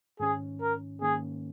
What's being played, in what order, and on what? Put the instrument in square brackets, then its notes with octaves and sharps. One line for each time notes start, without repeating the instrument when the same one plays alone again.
[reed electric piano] G#2 D#3 C#4 [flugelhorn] G#4
[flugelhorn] A#4
[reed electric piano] G#2 D#3 A#3 C#4 [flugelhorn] G#4